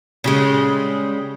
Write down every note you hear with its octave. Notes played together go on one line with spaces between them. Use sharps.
C#3 G3 G#3